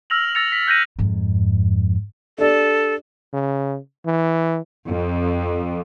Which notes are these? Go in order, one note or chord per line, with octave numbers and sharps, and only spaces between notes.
E6 F6 A#6 F7 F#7
E6 A6 A#6 C#7 F7
B6
F#6 G6 A6 A#6 D#7 F#7
F2 G#2
D4 G4 A4 D5
C#3
E3
F2